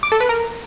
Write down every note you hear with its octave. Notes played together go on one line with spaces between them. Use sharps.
D6
A4
B4
A#4